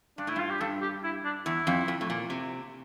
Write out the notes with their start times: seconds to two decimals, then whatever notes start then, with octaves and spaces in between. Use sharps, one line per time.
0.18 G2 D4
0.27 A2 E4
0.36 G2 F4
0.50 G4
0.60 G2 A4
0.82 G4
1.04 E4
1.25 D4
1.45 E2 E4
1.67 F2
1.88 F2
2.01 A2
2.10 A#2
2.30 C3